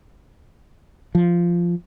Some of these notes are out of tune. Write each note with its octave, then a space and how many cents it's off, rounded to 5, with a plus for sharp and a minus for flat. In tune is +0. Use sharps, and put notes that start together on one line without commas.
F3 -10